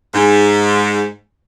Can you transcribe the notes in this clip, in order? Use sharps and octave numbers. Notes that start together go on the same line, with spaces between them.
G#2